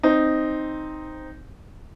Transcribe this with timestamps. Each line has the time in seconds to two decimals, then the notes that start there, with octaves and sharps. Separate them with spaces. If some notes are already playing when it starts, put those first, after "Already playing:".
0.03 C4 D#4